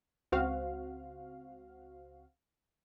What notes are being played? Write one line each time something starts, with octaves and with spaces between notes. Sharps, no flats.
C#2 C4 F#4 F5